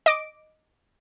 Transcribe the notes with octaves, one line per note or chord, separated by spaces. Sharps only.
D#5 D6 D7